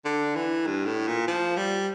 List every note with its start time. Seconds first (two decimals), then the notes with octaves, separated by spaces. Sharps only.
0.05 D3
0.36 E3
0.67 G2
0.86 A2
1.07 A#2
1.27 F3
1.57 G3